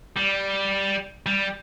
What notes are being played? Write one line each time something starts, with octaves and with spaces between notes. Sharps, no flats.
G3
G3